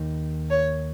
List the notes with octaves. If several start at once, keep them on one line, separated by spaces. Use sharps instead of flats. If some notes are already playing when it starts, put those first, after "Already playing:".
Already playing: D#2 D#3
C#5